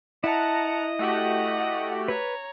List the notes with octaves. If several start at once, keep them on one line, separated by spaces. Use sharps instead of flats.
E4 D#5 F#5 A5 A#5
A3 F#4 G4 F#5
B4 C#5 A#5